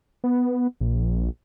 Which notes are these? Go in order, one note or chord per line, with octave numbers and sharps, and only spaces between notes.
B3
A#1